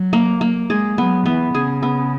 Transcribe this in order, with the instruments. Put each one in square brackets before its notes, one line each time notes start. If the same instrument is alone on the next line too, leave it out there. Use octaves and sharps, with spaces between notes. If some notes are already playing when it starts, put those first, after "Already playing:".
Already playing: [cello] F#3
[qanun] A#3
A#3
[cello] G#3 [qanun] G#4
[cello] F#3 [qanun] B3
[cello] E3 [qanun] B3
[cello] C#3 [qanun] G#4
[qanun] B3